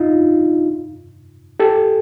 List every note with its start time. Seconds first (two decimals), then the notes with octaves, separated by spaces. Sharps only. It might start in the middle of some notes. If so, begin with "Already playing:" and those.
Already playing: D4 D#4 F4
1.60 G4 A4